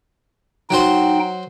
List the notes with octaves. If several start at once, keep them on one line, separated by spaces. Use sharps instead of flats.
F#3 D#4 F#4 C5 G5